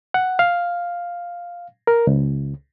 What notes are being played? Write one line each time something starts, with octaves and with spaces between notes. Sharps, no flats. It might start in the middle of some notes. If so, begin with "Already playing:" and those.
F#5
F5
A#4
C#2